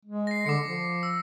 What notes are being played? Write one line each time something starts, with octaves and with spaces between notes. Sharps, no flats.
G#3
A#6 C7
D3 D6 C#7
F3
E6